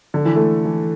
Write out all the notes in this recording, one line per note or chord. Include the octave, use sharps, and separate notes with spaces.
D3
E3
A3
E3